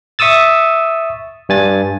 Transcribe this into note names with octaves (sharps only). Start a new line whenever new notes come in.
E5 C#6 D#6 E6 A6
G2 G#5 A6